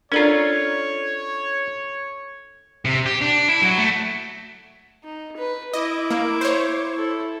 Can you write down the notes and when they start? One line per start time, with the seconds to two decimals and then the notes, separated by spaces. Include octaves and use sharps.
0.12 C#4 D4 F4 A4 A#4 C#5 D5 A#5
2.85 C3
3.06 G4
3.21 D4
3.48 E4
3.62 F#3
3.78 A3
5.03 D#4
5.36 B4
5.73 E4 D#5 D6
6.11 A#3
6.41 C5 C#5
6.93 E4 A4